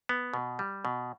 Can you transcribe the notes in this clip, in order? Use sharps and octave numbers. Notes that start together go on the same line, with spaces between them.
B3
B2
G3
B2